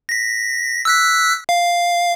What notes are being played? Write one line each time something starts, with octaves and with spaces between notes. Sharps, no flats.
A#6 B6
E6 F#6 B6
F5